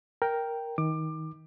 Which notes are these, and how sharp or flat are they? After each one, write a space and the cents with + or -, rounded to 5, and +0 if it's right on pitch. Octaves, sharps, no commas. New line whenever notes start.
A#4 +0 G5 +0
D#3 +20 D6 +20